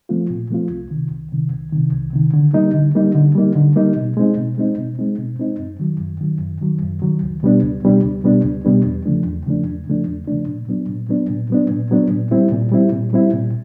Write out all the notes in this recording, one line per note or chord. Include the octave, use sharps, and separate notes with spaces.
F3 A3 C4 F4
A#2
F3 A3 C4 F4
C2
C3 D#3
C2
C3 D#3
C2
C3 D#3
C2
C3 D#3
D3
G3 A#3 D#4
D3
G3 A#3 D#4
D3
G3 A#3 D#4
D3
G3 A#3 D#4
B2
G#3 C4 D#4
B2
G#3 C4 D#4
B2
G#3 C4 D#4
B2
G#3 C4 D#4
F#2
D#3 F#3
F#2
D#3 F#3
F#2
D#3 F#3
F#2
D#3 F#3
C#2
B2 G3 B3 D4
C#2
B2 G3 B3 D4
C#2
B2 G3 B3 D4
C#2
B2 G3 B3 D4
E2
C#3 F3 A3 D4
E2
C#3 F3 A3 D4
E2
C#3 F3 A3 D4
E2
C#3 F3 A3 D4
A#2
F#3 B3 D4
A#2
F#3 B3 D4
A#2
F#3 B3 D4
A#2
F#3 B3 D4
A#2
G3 C4 E4
A#2
G3 C4 E4
A#2
G3 C4 E4
A#2